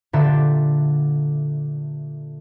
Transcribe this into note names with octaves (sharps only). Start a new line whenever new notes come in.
A#2 D3 G4 E5 C6 A6